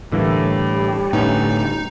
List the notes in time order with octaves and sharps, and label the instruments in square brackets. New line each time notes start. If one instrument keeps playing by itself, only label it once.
[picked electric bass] A2 [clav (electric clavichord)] D3 E3 A#3 [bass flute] G3
[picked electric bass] A2 D3 [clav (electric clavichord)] B3 C#4 [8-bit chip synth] D#4